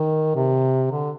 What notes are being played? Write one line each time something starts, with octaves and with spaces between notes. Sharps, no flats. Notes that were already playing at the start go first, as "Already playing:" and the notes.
Already playing: D#3
C3
D3